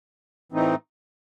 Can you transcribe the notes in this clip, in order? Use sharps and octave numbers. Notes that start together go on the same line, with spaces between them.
A2 E3 A3 C4 D#4